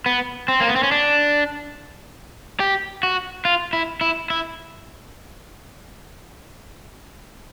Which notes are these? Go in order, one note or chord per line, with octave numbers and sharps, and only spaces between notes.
B3
C4
A#3
B3
C4
C#4
D4
G4
F#4
F4
E4
E4
E4